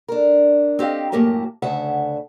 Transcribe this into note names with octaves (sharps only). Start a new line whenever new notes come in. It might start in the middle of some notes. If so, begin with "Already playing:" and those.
D4 A#4
C4 G4 D#5 F5
F#2 A2 A#3 G4 A#4 A5
D2 C#3 E5 F#5 A5